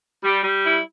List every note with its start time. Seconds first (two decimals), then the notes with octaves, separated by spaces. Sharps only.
0.24 G3
0.44 G3
0.65 E4